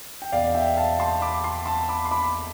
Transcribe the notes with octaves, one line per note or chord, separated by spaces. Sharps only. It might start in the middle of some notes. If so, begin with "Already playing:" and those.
G5
E2 B2 D5 F5
E5 G5
F5 A5
A5 C6
B5 D6
A5 C6
A5 C6
B5 D6
C6
B5 D6